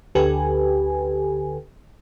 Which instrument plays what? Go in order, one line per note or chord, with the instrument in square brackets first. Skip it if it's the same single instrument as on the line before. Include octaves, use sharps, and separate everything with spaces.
[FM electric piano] D2 D3 G4 A4 B4 G#5